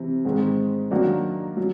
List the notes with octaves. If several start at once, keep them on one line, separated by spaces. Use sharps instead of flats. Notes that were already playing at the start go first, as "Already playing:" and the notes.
Already playing: C3 E3
G#2 D#3 G#3 C4
D#3 F#3 A#3 D4 F#4
F#3